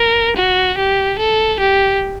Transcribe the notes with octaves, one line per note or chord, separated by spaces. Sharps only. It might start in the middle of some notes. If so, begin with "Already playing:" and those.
Already playing: A#4
F#4
G4
A4
G4